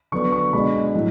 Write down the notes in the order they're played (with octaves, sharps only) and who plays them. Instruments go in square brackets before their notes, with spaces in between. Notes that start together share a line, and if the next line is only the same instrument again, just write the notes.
[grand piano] D3 F#3 B3 D4 C#6
C#6
B2 G#3 D4 B5
A2 F#3 A3